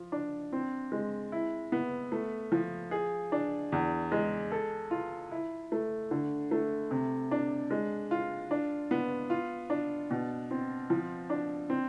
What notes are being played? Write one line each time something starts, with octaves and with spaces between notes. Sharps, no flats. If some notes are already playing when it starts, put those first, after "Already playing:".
Already playing: F3
D4
C4
G#3
E4
B3
A3
F3
G#4
D4
E2
G#3
A4
F4
E4
A3
D3
A3
C3
D4
G#3
F4
D4
B3
F4
D4
B2
C4
F3
D4
C4